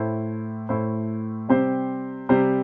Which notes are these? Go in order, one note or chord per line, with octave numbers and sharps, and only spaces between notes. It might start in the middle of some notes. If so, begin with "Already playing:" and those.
Already playing: A2 A3 E4 C5
A2 A3 E4 C5
C3 G3 C4 G4 C5
C3 G3 C4 G4 C5